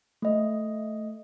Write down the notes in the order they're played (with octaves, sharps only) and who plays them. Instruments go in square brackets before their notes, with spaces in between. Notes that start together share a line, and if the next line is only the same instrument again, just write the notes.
[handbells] A3 D#5